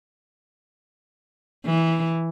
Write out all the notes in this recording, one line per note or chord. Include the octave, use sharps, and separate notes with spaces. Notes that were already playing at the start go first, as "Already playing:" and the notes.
E3